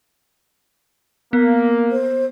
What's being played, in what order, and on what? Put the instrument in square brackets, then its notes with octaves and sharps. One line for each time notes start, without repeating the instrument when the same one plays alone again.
[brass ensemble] A#3 [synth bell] B3
[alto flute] C5